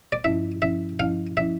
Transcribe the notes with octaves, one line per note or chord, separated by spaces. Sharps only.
D5
G2 F3 C#4 E4 E5
G2 F3 C#4 E4 E5
G2 F3 C#4 E4 F5
F3 C#4 E4 E5